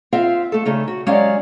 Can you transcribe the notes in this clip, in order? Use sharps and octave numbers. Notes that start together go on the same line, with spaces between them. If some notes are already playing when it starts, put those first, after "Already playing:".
C4 F4 E5 F5
A3 A4
C#3 A3 D#4
F#4
F#3 G#3 C#4 G4 D5 F5